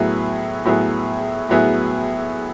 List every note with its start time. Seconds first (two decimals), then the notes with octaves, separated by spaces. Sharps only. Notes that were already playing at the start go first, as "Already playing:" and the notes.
Already playing: A2 F#3 B3 E4 G#4
0.65 A2 F#3 B3 E4 G#4
1.49 A2 F#3 B3 E4 G#4